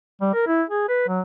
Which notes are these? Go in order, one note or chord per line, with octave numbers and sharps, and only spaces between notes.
G3
A#4
E4
G#4
B4
F#3